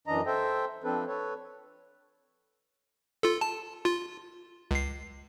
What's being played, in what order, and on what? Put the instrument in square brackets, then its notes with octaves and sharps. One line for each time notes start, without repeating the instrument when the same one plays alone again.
[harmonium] F#2 E3 D4 D#5 A#5
A4 C5 E5 G5
F3 C4 D4 A4 B4
A4 B4 C#5
[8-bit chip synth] F4 A4
A5
F4
C#2 C7